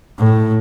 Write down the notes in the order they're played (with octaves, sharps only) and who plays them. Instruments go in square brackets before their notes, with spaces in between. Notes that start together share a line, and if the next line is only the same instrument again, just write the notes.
[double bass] A2